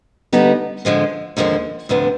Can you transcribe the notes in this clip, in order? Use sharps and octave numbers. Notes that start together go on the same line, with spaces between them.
D3 G3 B3 D#4
D3 F3 G#3 C4
D#2 D3 F3 G#3 C4
D2 C3 F3 B3 D4